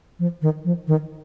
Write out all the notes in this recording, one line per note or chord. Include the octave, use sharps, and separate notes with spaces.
F3
D#3
F3
D#3